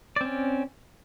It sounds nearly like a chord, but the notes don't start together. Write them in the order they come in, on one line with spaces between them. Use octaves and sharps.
D5 C4 C#4